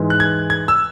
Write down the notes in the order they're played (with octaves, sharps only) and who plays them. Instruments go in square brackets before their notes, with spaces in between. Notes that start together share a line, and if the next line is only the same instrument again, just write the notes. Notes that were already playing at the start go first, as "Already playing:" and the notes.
Already playing: [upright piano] G#2 E3 G#3
[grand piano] F#6
G#6
G#6
E6